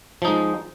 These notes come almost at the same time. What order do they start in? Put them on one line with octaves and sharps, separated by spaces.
F3 D#4 G#3